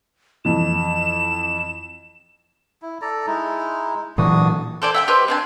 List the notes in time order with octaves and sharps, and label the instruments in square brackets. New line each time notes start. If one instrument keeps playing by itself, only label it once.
[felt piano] F2 E3 [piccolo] E7
[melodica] E4
A4 D5 A#5
G#3 D#4 E4
[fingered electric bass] A#2 E3 F#3 [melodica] D4 F#4 D#6
[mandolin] A4 C5 D5 G#5
E5 F#5 G5
G4 B4 C5 D#5
C4 D4 G#5